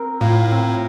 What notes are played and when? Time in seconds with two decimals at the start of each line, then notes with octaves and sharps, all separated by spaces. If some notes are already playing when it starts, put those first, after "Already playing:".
Already playing: C4 A#4
0.20 A2 F4
0.51 C4